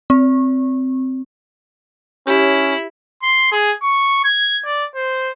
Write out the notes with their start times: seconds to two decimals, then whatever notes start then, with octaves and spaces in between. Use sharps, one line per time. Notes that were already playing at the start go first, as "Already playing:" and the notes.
0.10 C4
2.27 C#4 E4 G4 C#5
3.23 C6
3.52 G#4
3.83 C#6
4.24 G#6
4.65 D5
4.95 C5